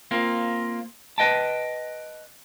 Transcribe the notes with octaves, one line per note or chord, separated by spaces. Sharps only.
A#3 C4 F4
B4 D#5 G5 A5